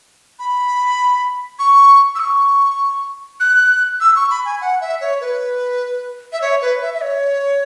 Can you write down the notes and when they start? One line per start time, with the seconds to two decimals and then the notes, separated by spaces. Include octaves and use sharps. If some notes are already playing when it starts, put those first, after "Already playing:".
0.39 B5
1.59 C#6
2.15 E6
2.20 C#6
3.40 F#6
4.01 E6
4.16 C#6
4.30 B5
4.45 G#5
4.61 F#5
4.81 E5
5.01 C#5
5.21 B4
6.33 E5
6.41 C#5
6.62 B4
6.82 E5
6.94 E5
7.01 C#5